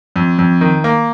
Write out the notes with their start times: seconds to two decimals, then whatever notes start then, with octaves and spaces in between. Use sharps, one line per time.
0.16 F2
0.38 F2
0.61 D#3
0.84 A#3